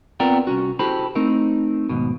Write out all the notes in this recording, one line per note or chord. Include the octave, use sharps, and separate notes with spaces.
B3 C4 F4 A#4 D5 G5
C2 C#4 F#4
E4 F#4 G4 A4 C5 B5
A3 C4 D#4 A#4
D#2 G#2 B2